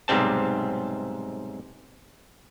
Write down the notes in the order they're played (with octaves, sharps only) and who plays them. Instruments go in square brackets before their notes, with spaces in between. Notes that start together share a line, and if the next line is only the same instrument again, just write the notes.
[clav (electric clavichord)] B1 G#2 C3 G3 C4 A5